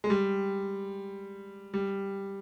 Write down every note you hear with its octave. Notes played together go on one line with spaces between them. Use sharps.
G#3
G3
G3